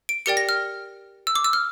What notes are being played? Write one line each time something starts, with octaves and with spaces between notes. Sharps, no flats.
D7
G4 A#4 D5 G5 C#7
A#6
F6
E6
D6
E6
F6